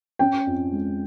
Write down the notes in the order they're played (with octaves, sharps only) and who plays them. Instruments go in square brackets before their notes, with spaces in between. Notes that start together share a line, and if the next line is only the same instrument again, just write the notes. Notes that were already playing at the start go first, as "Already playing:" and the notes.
[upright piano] C#4 G5
F2
G#3